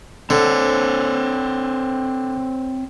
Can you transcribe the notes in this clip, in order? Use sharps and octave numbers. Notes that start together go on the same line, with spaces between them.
D3 C4 C5 C#5